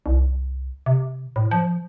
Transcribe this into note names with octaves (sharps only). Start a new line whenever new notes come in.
C2
C3
A2
F3